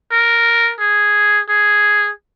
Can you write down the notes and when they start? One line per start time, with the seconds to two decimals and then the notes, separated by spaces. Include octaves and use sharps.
0.12 A#4
0.80 G#4
1.49 G#4